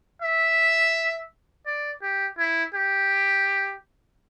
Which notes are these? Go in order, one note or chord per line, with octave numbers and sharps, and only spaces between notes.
E5
D5
G4
E4
G4